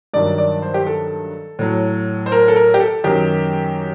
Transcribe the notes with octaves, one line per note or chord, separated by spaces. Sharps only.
G2 D#3 F#3 D5
D5
C5
G4
A4
A2 F#3
C5
A#4
A4
A#4
G4
A4
F#2 D#3 F#3 G4